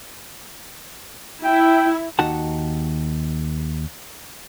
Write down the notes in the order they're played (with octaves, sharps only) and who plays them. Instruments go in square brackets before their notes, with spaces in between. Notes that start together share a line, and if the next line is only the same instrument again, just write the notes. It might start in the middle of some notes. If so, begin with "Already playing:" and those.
[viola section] E4 [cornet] G5
[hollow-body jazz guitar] D#2 D#4 F#4 F#5 A5